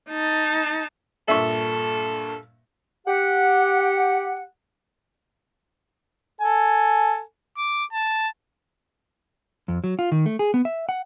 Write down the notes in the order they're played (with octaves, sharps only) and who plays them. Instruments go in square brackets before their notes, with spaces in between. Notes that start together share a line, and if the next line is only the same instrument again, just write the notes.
[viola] D#4 A5
[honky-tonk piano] G2 A#2 C#6 [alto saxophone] A4 [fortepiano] E5
[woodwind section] G4 F#5
[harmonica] A4 G#5
[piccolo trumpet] D6
A5
[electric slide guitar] F2
F#3
F4
D#3
A3
G#4
B3
E5
F#5